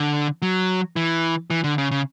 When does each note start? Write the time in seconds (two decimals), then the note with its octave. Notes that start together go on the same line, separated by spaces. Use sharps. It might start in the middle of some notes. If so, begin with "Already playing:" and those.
Already playing: D3
0.42 F#3
0.96 E3
1.50 E3
1.64 D3
1.78 C#3
1.91 C#3